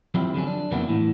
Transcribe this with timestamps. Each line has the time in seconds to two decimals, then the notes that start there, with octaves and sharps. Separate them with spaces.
0.14 F3 F#3 C4 E4 F4 G4
0.34 D3 F3 F#3 C#4
0.47 D4
0.71 F2 C#3 F#3 A#3 B3 E4
0.89 A2 E3